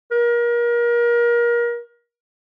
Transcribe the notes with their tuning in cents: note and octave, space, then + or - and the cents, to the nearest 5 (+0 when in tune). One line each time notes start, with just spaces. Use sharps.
A#4 +30